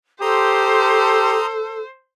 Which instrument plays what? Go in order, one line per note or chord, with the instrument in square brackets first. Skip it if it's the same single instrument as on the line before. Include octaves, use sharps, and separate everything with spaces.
[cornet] G4 [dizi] A4 [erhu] C5 [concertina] A#5 C6 D#6